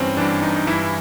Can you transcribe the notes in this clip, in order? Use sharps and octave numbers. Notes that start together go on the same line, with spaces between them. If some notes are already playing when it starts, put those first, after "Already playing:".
Already playing: G2 E3 C4 C#4
G2 E3 D4
D#4
D#4
G2 E3 E4